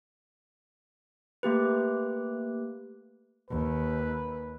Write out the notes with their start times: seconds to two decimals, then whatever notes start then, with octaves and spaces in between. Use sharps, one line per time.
1.43 A3 A#3 G4 B4
3.50 D#2 B4